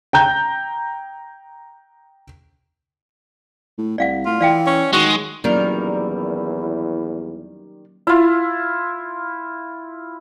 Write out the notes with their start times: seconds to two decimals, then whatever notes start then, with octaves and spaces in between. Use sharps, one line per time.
0.13 G5 A#5 G6
3.78 A2
3.98 C2 D5 F5 F#5
4.26 A2 F4
4.41 E3 D5 F5 G5
4.67 C#4
4.93 D#3 G#3 F#4
5.44 E2 D#3 F#3 G3 A#3 C#4 E4 A#4
8.07 E4 F4